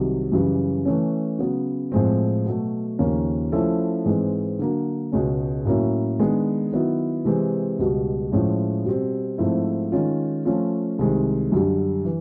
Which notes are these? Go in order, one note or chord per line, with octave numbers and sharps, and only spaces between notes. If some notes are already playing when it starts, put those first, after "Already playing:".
Already playing: C2 C3 D#3 F#3
F#2 C#3 E3 G3
E3 A3 C#4
C#3 F#3 B3
A2 F3 G#3 C4
B2 F#3 A3
D#2 C#3 F3 A#3 C#4
F3 A3 C#4 E4 A4
G#2 E3 G#3 C4
D3 F#3 A#3
C#2 B2 G#3 C#4
A2 F#3 A#3 C#4 E4
D#3 G#3 B3 D4
D#3 F#3 B3 E4
C3 E3 G#3 C4
C#2 B2 G3
A2 F3 G#3 C#4 E4
B2 G3 C4
G#2 F3 A3 C4 E4
D#3 G#3 C#4 F4
F3 A3 C#4 F4
C2 C3 D#3 G#3 C4
F#2 D3 G3
E3